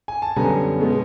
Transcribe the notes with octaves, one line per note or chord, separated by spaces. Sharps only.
G#5
A5
F#2 D3 G3 B3 G#5 A#5
B2 G#3 B3